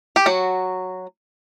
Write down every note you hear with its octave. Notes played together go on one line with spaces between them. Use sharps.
G4
F#3 F#4